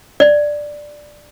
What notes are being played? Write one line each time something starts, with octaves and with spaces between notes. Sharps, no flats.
D5